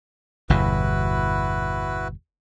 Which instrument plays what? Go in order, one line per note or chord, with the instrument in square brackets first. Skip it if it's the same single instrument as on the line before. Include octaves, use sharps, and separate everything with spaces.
[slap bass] G1 E2 B2 [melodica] E4 F#4 B4